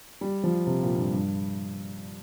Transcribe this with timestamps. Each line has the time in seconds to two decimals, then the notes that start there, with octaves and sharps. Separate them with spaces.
0.21 G3
0.44 F3
0.67 C3
0.82 A#2
0.97 G2
1.12 G2